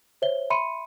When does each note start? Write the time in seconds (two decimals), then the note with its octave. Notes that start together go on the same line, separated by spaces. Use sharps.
0.22 C5 C#5 E5 G7
0.50 E5 B5 C6 C#7 D#7